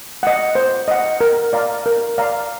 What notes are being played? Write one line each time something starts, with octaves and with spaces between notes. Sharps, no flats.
D#5 F#5
C5
D#5 F#5
A#4
D5 F5 A#5
A#4
D5 F5 A#5